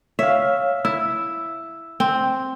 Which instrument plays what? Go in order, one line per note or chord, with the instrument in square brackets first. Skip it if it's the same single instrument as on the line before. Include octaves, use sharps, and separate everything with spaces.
[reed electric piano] C#5 F5 [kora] E5
[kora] E4 [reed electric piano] E6
[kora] C4